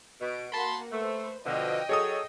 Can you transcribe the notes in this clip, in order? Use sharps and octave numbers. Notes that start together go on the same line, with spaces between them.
B2 D7
A#3 F#4 F#5 A5 B5 C6
A3 B4 C5
B2 D3 F3 D#5 G5
F#3 G#4 A4 C#5 D#6